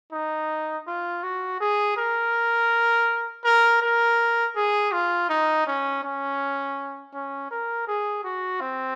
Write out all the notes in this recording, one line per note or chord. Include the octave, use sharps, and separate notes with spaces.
D#4
F4
F#4
G#4
A#4
A#4
A#4
G#4
F4
D#4
C#4
C#4
C#4
A#4
G#4
F#4
C4